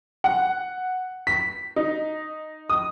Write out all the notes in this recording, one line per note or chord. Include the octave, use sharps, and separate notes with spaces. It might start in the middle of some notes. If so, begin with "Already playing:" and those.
F#5
B6
D#4
D#6